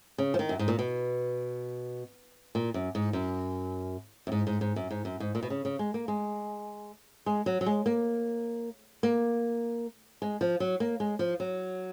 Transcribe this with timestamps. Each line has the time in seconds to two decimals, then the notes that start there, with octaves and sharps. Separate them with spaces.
0.18 C#3
0.34 F3
0.39 D#3
0.49 F#2
0.59 G#2
0.68 A#2
0.79 B2
2.55 A#2
2.74 F#2
2.95 G#2
3.13 F#2
4.27 F#2
4.32 G#2
4.47 G#2
4.61 G#2
4.76 F#2
4.91 G#2
5.05 F#2
5.20 G#2
5.35 A#2
5.43 B2
5.50 C#3
5.65 C#3
5.79 G#3
5.94 A#3
6.08 G#3
7.26 G#3
7.46 F#3
7.61 F#3
7.66 G#3
7.86 A#3
9.03 A#3
10.22 G#3
10.41 F3
10.60 F#3
10.80 A#3
11.00 G#3
11.19 F3
11.40 F#3